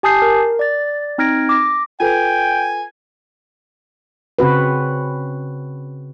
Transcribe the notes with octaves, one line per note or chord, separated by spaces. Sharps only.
G4 G#5 A5 D#6 G6 C7
A#4
D5 A6
C4 D#4 F6 G#6 A#6 D7
D6 A#6
F4 A4 B4 G5 G#5
C#3 C4 F#4 B4